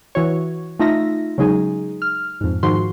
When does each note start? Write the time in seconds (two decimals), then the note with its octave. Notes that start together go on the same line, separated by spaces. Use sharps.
0.15 E3 F#4 C#5
0.80 A3 D#4 F4 E5 A#6
1.38 C#3 F#3 G#3 D#4 G#4
2.02 F6
2.41 F2 G#2
2.63 G#2 D#3 F3 F#4 C6